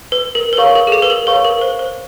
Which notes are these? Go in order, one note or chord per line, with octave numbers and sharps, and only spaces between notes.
B4
A#4
B4
G#4 A#4 C#5 F5 A#5 C#6
A#4
G#4
A4
B4
A#4
G#4 B4 C#5 F5 A#5 C#6
A#4
C5
C5